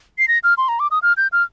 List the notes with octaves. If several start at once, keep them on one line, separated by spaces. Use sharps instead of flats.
C7
A#6
F6
C6
A#5
D6
D#6
F6
G6
F6